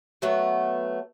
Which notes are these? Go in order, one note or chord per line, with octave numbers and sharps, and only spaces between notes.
F#3 A3 B3